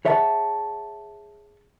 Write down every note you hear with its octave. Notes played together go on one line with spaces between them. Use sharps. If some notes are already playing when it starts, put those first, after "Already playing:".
G#4 C#5 E5 F#5 G#5 A5